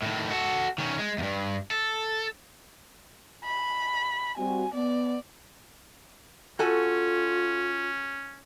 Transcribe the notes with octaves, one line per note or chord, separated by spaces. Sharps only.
A2 D#3
F#4 A4
D#3 C#4
G#3
E2 G2
A4
B5
G3 C4 F#4 G#5
B3 D5
C#4 F4 F#4 A4 G#5